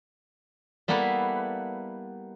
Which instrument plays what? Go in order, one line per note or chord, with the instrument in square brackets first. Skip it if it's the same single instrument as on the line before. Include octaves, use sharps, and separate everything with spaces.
[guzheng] G3 A#3 B3 E4 A4 B4